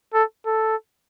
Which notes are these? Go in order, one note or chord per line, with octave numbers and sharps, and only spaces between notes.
A4
A4